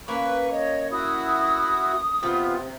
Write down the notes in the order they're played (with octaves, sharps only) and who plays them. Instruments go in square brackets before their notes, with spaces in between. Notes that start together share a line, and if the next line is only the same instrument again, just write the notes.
[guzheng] A#3 C#4 [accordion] B4 C#6
[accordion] C#5 [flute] D#5
[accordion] E4 F#4 [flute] D#6
[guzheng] C3 [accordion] B3 F4